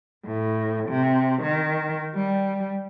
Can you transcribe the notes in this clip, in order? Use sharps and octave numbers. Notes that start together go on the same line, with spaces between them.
A2
C3
D#3
G3